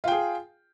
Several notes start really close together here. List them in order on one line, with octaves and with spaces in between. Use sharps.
F4 G5 G#4